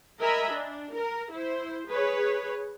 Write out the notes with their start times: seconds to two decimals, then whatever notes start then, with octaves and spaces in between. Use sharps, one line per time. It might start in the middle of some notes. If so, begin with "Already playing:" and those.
0.20 A#4 D#5 E5 G#5 A#5 B5
0.51 D4
0.93 A#4
1.32 E4 C5
1.88 G#4 B4 C#5